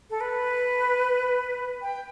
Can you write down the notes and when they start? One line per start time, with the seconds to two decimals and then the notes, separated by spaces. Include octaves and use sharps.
0.10 A4
0.21 B4
1.82 G5